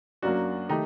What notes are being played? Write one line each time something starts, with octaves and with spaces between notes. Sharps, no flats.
F#2 F#3 A#3 D4 F#4
D#3 A3 D#4 G4